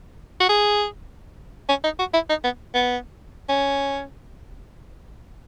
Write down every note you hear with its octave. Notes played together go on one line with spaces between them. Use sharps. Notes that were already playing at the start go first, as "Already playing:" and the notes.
F#4
G#4
C#4
D#4
F#4
E4
D#4
B3
B3
C#4